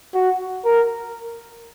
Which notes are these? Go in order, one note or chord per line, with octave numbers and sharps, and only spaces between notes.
F#4
A#4